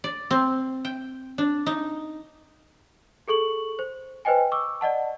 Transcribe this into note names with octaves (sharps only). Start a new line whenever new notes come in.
D5
C4
G5
D4
D#4
G#4 A4 C#6 F#7
C5
B4 C5 D#5 G5 G#5
C#6 D6 E6
D5 D#5 F#5 A5